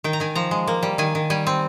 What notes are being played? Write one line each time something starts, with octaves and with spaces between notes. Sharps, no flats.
D#3 G5
A#5
D#3 G#5
F3 A#5
G#3
A#3
G3
D#3 G#5
D#3
G3 G#5
C4